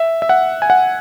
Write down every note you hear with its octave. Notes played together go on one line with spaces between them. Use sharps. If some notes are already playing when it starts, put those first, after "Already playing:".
Already playing: E5
E5
F#5
G#5
F#5